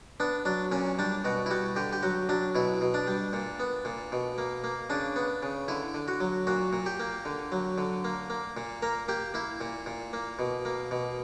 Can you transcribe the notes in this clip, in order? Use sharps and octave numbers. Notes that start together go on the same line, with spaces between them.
B3 D4
F#3 D4
A#2 C#4
G3 D4
B2 F#4
E4
G3 F#4
D3 G4
G4
F#3 F#4
F#3 D4
B2 E4
B2
D4
G3
A#2
B3
A#2
B2
A#3
A#3
C#3 D4
B3
C#3
D3 E4
D3
F#4
F#3
A#2 F#4
A#2
G4
A#3
D3
F#3
D3
A#3
A#3
A#2
A#3 A#4
A#3 G4
A#3 E4
A#2
A#2
A#3
B2
A#3
B2